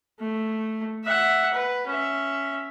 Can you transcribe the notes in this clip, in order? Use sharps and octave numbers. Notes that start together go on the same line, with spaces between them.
A3
E5 F#5
B4
C#4 E5